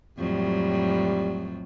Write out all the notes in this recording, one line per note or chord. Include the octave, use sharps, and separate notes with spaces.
F2 A2 F#3 G3